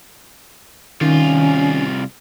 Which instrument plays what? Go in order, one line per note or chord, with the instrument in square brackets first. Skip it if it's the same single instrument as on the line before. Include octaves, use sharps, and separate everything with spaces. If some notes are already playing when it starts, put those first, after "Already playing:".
[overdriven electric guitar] C2 F4 [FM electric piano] D#3 [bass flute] C#4